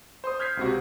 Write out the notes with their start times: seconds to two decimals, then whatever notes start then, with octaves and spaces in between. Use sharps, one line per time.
0.24 C5 C6 D#6
0.40 F6 G6 G#6 B6 C7
0.57 C#2 C3 F#4